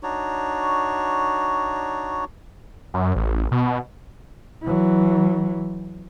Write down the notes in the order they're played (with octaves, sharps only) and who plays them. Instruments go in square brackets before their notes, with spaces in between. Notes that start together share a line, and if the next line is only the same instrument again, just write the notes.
[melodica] D4 D#4 F#4 C#5
[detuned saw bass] F#2
A1
B2
[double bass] E3 F#3